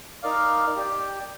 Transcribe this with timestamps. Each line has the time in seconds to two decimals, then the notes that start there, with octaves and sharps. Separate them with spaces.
0.23 D#4 A#4 D5 F5
0.76 G4 D5 G5